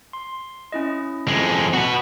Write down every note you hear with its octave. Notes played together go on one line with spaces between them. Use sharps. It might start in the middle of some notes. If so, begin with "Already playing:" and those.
C6
C#4 E4 D#5
F2 G#3
F#4 B4 F#5 A5